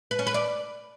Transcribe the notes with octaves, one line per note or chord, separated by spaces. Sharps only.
B4
C#4
B4
D5